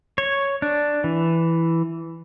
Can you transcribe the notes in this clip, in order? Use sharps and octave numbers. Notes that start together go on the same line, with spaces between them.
C#5
D4
E3